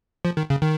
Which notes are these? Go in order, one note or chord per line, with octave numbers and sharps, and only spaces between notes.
F3
D#3
C#3
D#3